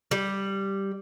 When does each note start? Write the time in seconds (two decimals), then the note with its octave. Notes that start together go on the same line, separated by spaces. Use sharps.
0.11 G3